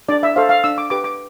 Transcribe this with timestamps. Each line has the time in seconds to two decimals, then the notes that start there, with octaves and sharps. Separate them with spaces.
0.09 D4 D5
0.23 E5
0.36 A4 C5 F5
0.49 F5
0.64 D4 E6
0.78 D6
0.90 G4 B4 D6
1.04 D6